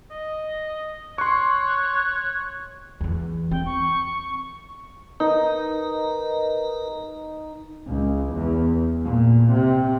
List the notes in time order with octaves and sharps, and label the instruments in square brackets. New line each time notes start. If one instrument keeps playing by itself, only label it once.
[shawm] D#5
[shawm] C#5 [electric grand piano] C6 C#6 [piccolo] F#6
[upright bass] E2 E3
[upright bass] C4 [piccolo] G5
[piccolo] C#6
[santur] D#4 [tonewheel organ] A#4 B4
[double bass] C#2
E2
A#2
C3